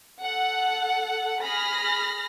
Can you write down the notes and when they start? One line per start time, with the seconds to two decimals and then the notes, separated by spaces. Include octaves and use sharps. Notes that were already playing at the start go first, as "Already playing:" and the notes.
0.22 A4 F#5
1.41 G#4 B5 F6 A#6